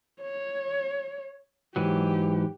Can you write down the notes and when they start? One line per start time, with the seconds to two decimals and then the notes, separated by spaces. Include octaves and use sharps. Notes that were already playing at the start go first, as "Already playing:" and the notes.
0.22 C#5
1.76 G#2 E3 F#3 G4